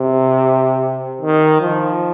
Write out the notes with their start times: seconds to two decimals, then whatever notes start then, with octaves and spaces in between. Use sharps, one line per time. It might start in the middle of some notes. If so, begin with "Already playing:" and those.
Already playing: C3
1.22 D#3
1.61 F3